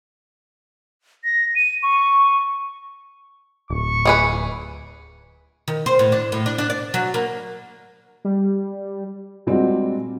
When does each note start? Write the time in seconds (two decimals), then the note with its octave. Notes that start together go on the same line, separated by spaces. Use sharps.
1.24 A#6
1.55 D#7
1.83 C#6
3.70 D1 C#6
4.05 E3 G#4 B4
5.68 D#3
5.86 C5
5.99 A2
6.12 D4
6.32 A2
6.46 D4
6.58 D4
6.70 D5
6.94 F#3
7.14 A#3
8.25 G3
9.47 A#2 G3 G#3 C4 D4 F#4